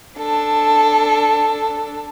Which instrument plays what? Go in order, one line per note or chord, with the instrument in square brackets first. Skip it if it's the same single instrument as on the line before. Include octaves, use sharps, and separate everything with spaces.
[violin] D4 A4